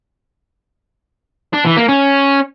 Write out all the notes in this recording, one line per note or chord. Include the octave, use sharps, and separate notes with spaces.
D4
E3
A#3
C#4